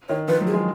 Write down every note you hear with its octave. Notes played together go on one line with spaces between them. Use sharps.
D#3 C#5
F3 B4
F#3
G#4
G#3